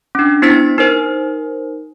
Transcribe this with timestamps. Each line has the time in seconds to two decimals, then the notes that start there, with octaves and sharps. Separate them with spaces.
0.15 C#4 D4
0.42 B3 D4 E4 C5 A6 B6
0.78 D#4 A#4 C5